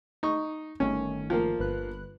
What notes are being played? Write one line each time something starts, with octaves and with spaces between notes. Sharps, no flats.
D#4 C#6
G1 D#3 A3 C#4
F3 A#3
G1 B4 F#6